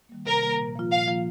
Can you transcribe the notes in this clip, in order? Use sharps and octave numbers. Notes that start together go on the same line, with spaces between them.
D#3 G3 A#3
C3 A#4
D#3 G3 A#3
A#2
F3 A#3 F4
A#2 F5
F3 A#3 F4